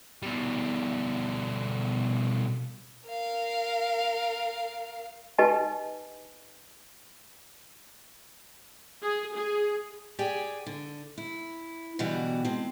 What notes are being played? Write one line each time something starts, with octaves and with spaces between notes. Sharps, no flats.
B2 G3
A#4 F5
D#4 G4 B4 D#5 G#5 A5
G#4
G#4
G4 G#4 D5 G5 G#5
D3
E4
B2 D3 E3 G3 F#4 G4
G#3 C4 A5